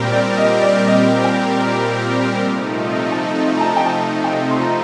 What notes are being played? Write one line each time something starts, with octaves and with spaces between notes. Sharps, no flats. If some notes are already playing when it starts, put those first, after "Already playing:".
Already playing: A#2 G3 C4 G4 A#4
D5
D#5
D5
D#5
G5
A#5
C3 F3 A3 D#4
A5
A#5
A5
G5
A5
G5
C6
A#5